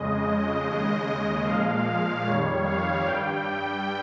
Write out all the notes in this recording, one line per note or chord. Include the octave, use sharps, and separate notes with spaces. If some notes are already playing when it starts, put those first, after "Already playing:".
Already playing: F2 C#3 G#3 D#5
D#2 C#3 G#3
A#2 F3 G#3 F5
F2 D#3 G3 C#5
F5
G2 G3 G5